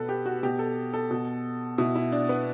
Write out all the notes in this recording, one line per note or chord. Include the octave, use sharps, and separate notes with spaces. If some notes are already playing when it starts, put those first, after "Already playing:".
Already playing: B2 A4 B4
G4
F#4
B2 G4
A4
A4
B2
B2 E4
E4
D4
B3